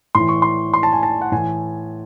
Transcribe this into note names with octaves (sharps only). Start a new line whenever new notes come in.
A2 E3 C6
C#6
C6
C6
A5
G#5
A5
F#5
A2 E3 G#5